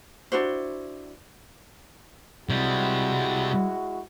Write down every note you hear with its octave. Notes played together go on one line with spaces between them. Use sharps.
D4 E4 F#4 C5
C3 G3 G#3 E4 F#4